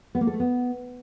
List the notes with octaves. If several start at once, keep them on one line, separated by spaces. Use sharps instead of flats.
B3
A#3
A4
A3
B3